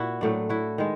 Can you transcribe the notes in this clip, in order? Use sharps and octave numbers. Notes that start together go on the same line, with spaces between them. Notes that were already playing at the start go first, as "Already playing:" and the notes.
Already playing: A#2 E4 F#4
A2 F#3 A3 D4
E4 F#4
D#3 G#3